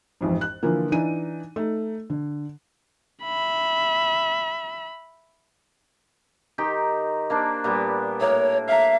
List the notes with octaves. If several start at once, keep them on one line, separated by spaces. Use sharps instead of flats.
A1 F2 G#2
F#6
D3 E3 F3 A#3
E3 D4 D#4 D#7
A3 D#4
D3
E5 B5
D#3 D#4 G4
A#3 D4 C5
A#2 G3 B3
A2 A#3 C#5
E5 F5 A#5